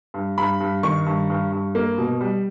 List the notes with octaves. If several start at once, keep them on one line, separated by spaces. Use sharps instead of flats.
G2
G2 B5
G2
D#3 C#6
G2
G2
G2
A#3
B2
G3